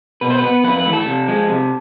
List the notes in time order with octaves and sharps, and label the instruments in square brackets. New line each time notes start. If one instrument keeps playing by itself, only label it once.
[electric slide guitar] B2 B4
C5
B3 B4
F2 B4
B4
E3 A3
A4
C3
F3 G#3
C3